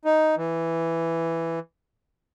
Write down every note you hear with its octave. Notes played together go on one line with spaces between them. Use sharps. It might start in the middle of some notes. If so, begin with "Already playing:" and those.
D#4
E3